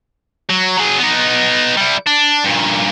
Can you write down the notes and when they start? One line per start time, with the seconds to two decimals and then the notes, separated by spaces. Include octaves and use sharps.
0.50 F#3
0.78 F#3 G#4
0.99 B3 D#4
1.77 G3 E4
2.07 D4
2.44 G2 A#2